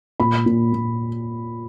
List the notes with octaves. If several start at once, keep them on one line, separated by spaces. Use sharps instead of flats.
A#2 B5
A#2
A#2